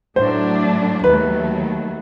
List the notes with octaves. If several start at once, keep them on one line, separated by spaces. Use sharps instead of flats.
A2 F#3 A3 D4 C5
D#2 D#3 F#3 A3 B4